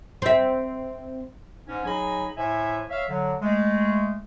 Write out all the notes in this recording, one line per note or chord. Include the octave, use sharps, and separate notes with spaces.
C4 E5
G#2 C#4
F#3 D#4 G#4 G#5 A#5 B5
A2 C5 E5 G#5
C#5 E5 F5
D3 F#3
G#3 A3